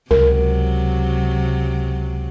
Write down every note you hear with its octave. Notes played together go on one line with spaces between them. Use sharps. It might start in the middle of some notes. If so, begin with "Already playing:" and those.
C#2 C3 F#3 A#4